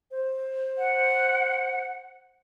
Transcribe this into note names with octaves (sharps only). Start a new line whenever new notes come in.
C5
F#5